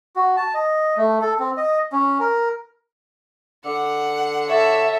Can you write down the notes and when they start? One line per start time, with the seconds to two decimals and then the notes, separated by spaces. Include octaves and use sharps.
0.16 F#4
0.37 A5
0.54 D#5
0.97 A3
1.22 A4
1.39 C4
1.57 D#5
1.92 C#4
2.20 A#4
3.65 D3 F#5
4.49 A4 C#5 E5